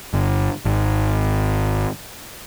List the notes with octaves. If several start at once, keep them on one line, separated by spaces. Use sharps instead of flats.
G1
G#1